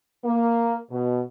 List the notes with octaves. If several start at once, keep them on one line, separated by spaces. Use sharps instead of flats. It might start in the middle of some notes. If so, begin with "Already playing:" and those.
A#3
B2